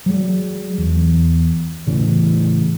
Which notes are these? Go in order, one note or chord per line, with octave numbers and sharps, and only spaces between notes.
F#3 G#3
E2
A2 C#3 E3